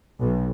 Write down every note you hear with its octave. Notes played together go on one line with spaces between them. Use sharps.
B1